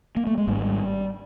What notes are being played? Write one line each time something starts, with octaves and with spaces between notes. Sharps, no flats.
A#3
A3
G#3
G#1 G#2 G3